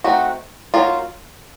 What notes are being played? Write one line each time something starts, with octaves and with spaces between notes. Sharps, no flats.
A3 C4 D#4 F#4
F#3 A#3 D#4 F4